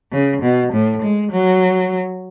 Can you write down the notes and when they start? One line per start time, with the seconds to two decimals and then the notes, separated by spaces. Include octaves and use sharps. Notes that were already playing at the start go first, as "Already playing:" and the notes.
0.12 C#3
0.42 B2
0.73 A2
1.02 G#3
1.32 F#3